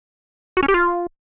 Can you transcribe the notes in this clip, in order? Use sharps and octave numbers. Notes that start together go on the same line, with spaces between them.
F#4
C#4
G4
F4